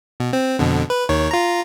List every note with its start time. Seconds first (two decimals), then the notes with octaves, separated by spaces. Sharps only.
0.20 B2
0.33 C4
0.59 F2 B2 D3
0.90 B4
1.09 D#2 D#3 C#5
1.31 F4 A#5